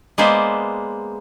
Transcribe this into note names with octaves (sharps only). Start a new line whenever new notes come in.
G#3 A#3 B3 C5 D5 E5